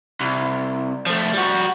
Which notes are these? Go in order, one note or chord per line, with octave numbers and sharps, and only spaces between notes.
C2
F3 A3
G3 F#4